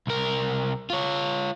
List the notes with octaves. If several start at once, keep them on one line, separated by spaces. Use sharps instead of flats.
C2 A#4
F4 C#5